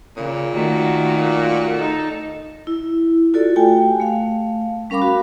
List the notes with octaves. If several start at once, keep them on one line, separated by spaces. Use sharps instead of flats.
A#2 C#3
D#3 A3 F#4
D#4 A4
E4
F4 F#4 A4 D5
A3 F#4 G4 G5 G#5
A3 F5
G3 C#4 A#4 F5 B5 D6
F#4